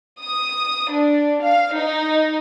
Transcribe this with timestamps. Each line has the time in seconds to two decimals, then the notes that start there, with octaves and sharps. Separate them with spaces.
0.20 D#6
0.91 D4
1.42 F5
1.74 D#4